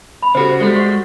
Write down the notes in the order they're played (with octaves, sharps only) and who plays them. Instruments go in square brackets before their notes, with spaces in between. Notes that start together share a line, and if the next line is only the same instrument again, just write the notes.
[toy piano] B5
[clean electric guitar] C#3 F#4 [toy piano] G4 A4 C5
[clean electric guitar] G3 G#3 [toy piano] F#4 A4 C5
[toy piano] F#5 C#6